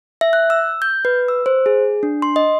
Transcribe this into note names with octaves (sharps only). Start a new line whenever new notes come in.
E5
F#6
E6
G6
B4
E6
C5
G#4
D4
C6
D#5